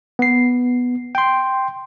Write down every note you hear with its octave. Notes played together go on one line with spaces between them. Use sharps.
B3 C7
G5 C6